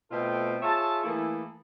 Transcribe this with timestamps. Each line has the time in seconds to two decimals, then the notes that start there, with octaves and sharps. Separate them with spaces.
0.11 B2 A3 C4 F4 A4 G5
0.62 F4 G#4 C#5 E5 A5
1.04 E3 A3 A#3 E4 G#4 A4